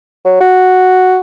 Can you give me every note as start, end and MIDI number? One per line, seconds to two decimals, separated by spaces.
0.25 0.36 54
0.40 1.20 66